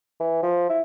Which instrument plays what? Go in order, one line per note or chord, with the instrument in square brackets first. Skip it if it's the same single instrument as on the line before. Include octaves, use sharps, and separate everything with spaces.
[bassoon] E3
F3
E4